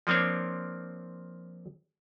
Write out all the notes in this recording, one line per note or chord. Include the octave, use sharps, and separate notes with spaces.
F3 A#3 C4 D4 C#5